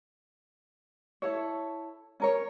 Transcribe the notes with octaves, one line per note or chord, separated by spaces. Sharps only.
E4 A4 C#5
C#4 A#4 C#5